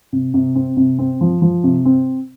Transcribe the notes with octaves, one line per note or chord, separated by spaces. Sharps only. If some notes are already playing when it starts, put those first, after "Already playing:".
C3
C3
C4
C3
C4
F3
F3
C3
C4